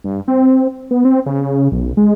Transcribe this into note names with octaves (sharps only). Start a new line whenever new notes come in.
G2
C4
B3
C4
C#3
B1
G#3